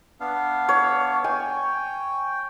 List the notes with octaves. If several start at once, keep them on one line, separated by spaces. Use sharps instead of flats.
B3 D4 F5
C#5
G5 G#5